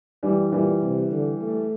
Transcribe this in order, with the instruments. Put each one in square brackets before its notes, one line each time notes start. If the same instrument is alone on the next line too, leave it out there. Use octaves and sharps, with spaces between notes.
[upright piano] E3 G3
[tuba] A#2 [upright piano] E3 G3
[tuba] C3
D3
A3